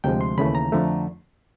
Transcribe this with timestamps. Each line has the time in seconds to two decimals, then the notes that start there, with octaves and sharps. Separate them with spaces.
0.04 D2 C3 F3 G#3 G5
0.21 C6
0.38 D#2 C#3 E3 A3 B5
0.55 A#5
0.72 F2 D3 F3 A3